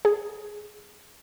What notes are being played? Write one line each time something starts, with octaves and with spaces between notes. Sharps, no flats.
G#4